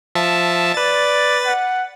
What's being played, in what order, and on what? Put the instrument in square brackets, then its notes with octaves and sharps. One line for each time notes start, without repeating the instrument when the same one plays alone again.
[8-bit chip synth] F3 E5 A5
[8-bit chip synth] B4 A6 [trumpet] D5
[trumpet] F#5